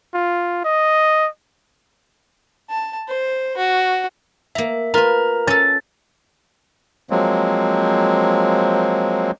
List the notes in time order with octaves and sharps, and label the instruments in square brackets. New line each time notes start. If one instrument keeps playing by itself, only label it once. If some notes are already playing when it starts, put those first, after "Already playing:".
[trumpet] F4
D#5
[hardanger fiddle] A5
C5
F#4
[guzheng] A#3 A#5 [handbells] E5
[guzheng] F4 B4 [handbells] A#4 A#5
[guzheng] C#4 A4 [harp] A6
[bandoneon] F3 F#3 G#3 A#3 C4